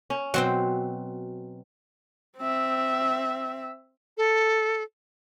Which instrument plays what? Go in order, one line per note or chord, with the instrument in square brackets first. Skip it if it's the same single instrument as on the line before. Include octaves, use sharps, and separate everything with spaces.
[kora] C#4
[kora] B2 [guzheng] F#3 C4 G5
[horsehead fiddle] C4 E5
[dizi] A4